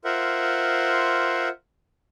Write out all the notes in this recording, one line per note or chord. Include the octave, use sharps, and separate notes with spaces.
F4 A#4 C5 E5 F#5